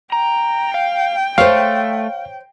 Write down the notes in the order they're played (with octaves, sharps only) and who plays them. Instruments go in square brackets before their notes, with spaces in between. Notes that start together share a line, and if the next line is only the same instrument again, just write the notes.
[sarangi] G5 [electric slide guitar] A#5
[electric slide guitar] F5
[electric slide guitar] A3 [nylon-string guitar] C5 C#5 [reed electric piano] F5